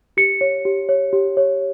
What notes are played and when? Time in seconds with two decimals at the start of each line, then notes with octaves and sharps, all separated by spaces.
0.17 G4 C#7
0.41 C#5
0.65 G4
0.89 C#5
1.13 G4
1.37 C#5